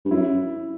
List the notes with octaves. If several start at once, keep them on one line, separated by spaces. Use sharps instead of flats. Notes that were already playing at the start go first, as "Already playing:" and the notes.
G2
F#2 E4